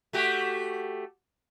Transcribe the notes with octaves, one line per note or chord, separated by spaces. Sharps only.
A3 F#4 G4